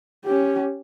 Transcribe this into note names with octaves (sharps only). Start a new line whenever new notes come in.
C#4 G4